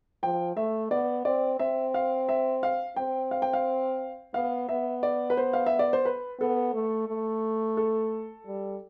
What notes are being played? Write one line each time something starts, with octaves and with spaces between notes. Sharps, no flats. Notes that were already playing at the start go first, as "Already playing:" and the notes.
F3 G5
A3 E5
B3 D5
C4 D5
C4 E5
F5
E5
F5
C4 G5
F5
G5
F5
B3 F5
B3 E5
D5
B4
C5
F5
E5
D5
C5
B4
B3 A4
A3
A3
A4
G3